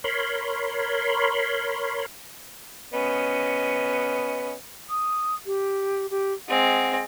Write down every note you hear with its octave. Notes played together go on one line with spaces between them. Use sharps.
A#4 C#5 B5 C6
B3 C#4 D#5
D#6
G4
G4
G#3 C4 F#5